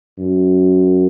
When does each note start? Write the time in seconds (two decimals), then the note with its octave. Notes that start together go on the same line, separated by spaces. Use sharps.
0.18 F#2